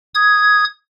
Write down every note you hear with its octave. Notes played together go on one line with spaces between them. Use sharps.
D#6 G#6